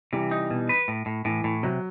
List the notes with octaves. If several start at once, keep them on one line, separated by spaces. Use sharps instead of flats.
C3 E3 G3
D#4
B2
B4
A2
A2
A2 E3
A2
C3 F#3